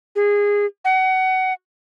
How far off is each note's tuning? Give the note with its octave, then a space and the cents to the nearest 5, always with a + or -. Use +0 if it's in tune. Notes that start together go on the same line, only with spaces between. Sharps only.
G#4 -20
F#5 +25